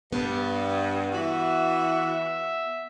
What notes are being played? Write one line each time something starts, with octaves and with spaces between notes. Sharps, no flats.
G2 B3
E3 F#4 E5